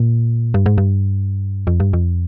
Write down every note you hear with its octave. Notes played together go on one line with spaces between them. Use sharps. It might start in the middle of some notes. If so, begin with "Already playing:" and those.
Already playing: A#2
G2
G#2
G2
F2
G2
F2